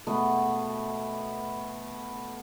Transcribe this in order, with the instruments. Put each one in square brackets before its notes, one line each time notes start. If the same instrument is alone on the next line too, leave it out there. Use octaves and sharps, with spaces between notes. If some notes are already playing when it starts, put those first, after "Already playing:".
[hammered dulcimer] B2 A3 B3 B4